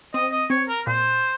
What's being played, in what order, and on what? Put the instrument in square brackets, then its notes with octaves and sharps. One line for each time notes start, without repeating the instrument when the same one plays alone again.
[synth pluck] C4 [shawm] D#5
[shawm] D#5
[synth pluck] C4 [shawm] C#5
[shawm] A#4
[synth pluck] A#2 [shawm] C5